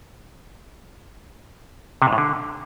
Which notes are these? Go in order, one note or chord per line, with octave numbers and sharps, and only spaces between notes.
C3
G#2
A2
D3